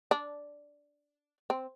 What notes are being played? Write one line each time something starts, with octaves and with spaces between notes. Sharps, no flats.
D4
C4